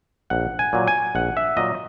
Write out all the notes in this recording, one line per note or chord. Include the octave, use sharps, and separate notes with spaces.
A#1 F#5
G#5
A#2 F#3
G#5
A#1 F#5
E5
A#2 F#3 D#5